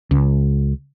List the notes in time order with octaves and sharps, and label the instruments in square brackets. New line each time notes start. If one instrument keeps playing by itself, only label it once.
[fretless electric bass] C#2